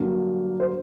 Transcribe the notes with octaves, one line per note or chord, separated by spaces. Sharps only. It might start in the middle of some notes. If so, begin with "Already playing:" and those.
Already playing: G2 D3 F#3 A#3
C5